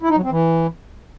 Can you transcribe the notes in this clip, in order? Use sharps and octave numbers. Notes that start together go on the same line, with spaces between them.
E4
D#4
F#3
C4
E3